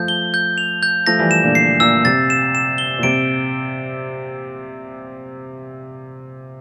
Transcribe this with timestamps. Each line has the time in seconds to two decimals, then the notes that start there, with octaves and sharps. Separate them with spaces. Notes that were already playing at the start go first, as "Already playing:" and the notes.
Already playing: F3 A3 G6
0.08 G7
0.34 G6
0.58 F7
0.83 G6
1.07 F3 A3 A#6
1.19 E3 G3
1.31 E7
1.44 A#2 D3
1.55 C7
1.80 A#2 E6
2.05 C3 A6
2.30 E7
2.55 E7
2.78 G7
2.98 A#2
3.03 C3 D7